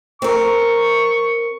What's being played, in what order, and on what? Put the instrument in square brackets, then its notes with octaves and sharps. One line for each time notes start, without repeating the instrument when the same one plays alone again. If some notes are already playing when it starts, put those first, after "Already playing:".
[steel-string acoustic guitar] C4 A#4 [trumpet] C#6